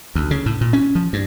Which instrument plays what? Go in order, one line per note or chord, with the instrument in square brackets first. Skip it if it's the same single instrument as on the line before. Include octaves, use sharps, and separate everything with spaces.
[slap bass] D2
C#3
A2
A#2
C#4
F3
G2